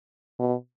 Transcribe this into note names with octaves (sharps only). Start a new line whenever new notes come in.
B2